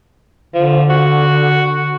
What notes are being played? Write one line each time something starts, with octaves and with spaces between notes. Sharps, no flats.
D3 F3
F#4